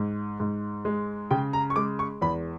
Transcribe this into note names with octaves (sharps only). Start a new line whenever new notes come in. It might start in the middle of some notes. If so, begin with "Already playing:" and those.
Already playing: G#2
G#2
G#3
C#3 G5
A#5
C#6
G#3 D6
C#6
E2 B5